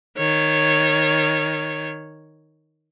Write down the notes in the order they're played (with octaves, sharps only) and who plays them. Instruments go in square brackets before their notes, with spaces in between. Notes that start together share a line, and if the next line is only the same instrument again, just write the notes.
[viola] D#3 C#5